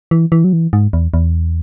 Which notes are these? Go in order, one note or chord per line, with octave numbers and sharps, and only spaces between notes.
E3
E3
F#3
E3
G#2
E2
E2